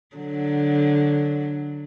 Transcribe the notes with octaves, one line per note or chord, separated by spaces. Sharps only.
D3 F#3